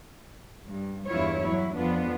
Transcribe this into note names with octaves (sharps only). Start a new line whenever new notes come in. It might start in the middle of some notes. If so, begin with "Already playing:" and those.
G2
E2 G2 E4 F4 C#5
F#3 E4
F2 B3 D4 F4